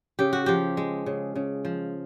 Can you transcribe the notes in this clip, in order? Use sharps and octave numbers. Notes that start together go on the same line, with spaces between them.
C#3 G4
F#4
F3 G4
G#3
C#3
C#3
F3